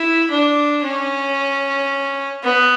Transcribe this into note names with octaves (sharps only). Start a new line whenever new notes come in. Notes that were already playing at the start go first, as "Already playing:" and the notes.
Already playing: E4
D4
C#4
B3